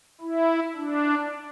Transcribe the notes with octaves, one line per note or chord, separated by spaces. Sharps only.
E4
D4